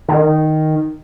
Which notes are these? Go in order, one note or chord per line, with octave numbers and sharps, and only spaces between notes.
D#3